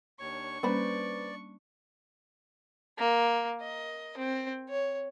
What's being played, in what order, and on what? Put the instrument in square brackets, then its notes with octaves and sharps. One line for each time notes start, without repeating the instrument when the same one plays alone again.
[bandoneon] D#2 C#5 [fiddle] D4 C#6
[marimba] G3 A#3 C#4 [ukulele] B4 C5 B5 [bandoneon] D5
[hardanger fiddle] A#3
D#5
C4
C#5